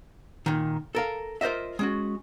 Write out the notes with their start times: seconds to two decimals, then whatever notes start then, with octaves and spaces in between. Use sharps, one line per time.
0.46 A#2 D#3
0.95 A4 A#4 F5
1.41 F4 A#4 C5 D#5 E5
1.79 G#3 C#4 F#4